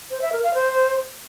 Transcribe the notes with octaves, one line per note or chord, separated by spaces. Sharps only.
C5
E5
A#4
F5
C5